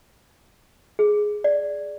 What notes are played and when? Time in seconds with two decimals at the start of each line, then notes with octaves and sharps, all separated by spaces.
0.99 G#4
1.44 D5